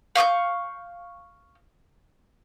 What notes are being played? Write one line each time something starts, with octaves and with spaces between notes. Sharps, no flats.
F5 C#6 D6 G6